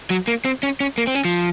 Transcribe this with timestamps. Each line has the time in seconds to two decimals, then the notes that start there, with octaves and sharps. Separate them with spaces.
0.10 F#3
0.28 A#3
0.45 C4
0.63 C#4
0.80 C#4
0.98 A#3
1.07 C4
1.15 C#4
1.25 F3